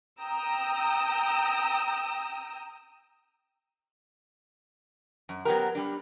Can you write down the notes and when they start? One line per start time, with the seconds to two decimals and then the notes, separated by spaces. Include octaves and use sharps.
0.21 G5 A#5 D#6 E6
5.29 F#2
5.45 F#3 B3 G4 A#4
5.75 G3 D4